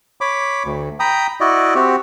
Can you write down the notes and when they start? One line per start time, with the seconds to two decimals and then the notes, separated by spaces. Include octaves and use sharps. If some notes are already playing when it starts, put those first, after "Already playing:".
0.21 C#5 B5 D6
0.65 D2
1.00 G5 A#5 B5 D#6
1.41 E4 F#4 D5 D#5
1.75 C4 F#4 G4